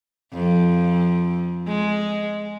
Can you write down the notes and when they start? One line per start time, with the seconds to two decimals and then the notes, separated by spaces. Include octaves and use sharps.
0.34 F2
1.68 G#3